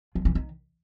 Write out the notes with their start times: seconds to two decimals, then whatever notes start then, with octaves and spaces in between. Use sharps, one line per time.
0.15 F3
0.25 E3
0.35 D#3